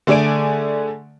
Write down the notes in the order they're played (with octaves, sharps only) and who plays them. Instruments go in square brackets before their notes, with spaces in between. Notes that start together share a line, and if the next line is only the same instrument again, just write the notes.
[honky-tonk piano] D3 A3 G#4 D5 G#5 D7